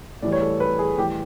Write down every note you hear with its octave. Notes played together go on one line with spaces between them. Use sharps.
A2 E3 G3 D5
C#5
A4
B4
G#4
A2 E3 G3 G4